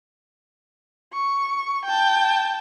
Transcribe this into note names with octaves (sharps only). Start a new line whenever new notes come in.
C#6
G5 A5